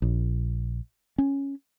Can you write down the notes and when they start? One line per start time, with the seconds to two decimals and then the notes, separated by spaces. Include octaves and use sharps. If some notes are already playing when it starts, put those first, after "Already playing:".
0.02 A#1
1.18 C#4